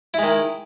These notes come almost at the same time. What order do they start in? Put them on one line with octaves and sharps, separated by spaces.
E4 G#3 D#3